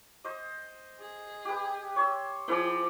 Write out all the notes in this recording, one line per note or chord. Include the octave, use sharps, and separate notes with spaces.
C5 D#5
G#4
G4 B4
C#5 C6 E6
F3 E4 G#4 D5